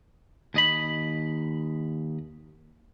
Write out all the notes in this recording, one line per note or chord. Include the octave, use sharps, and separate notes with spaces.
D#2 D#5 B5